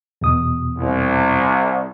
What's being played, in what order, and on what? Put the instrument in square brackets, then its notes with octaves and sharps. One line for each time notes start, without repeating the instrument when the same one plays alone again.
[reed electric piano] E2 B2 D#6
[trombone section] C2